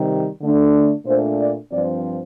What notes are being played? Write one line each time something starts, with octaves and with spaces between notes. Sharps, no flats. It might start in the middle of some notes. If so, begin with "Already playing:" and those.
Already playing: C3 D#3 G3
D3 A3 D4
A#2 A3 D4 C5
D5
G2 F3 C4 D5